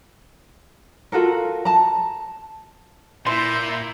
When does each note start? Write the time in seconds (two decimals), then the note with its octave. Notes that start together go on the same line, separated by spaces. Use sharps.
1.12 F4 F#4 A4 A#4
1.65 A5 A#5
3.26 A#2 E4 E5 C6 G6